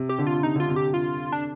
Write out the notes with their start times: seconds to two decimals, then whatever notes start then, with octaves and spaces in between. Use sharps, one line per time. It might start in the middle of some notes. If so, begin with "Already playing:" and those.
Already playing: C3
0.09 G4
0.18 D3
0.27 F4
0.43 C3 D#4
0.56 D3 F4
0.68 C3
0.76 G4
0.94 F4
1.32 D4